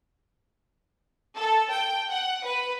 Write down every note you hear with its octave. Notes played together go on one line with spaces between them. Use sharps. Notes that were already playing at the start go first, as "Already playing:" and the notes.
A4
G5
F#5
B4